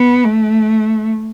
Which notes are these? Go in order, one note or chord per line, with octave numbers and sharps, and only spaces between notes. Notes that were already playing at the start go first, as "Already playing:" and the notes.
Already playing: B3
A3